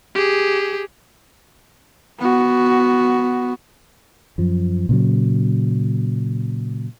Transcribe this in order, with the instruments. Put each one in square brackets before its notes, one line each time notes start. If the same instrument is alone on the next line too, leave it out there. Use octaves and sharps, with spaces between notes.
[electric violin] G4 G#4
[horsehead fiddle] B3 F#4
[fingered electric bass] F#2 F3
A#2 C#3 F#3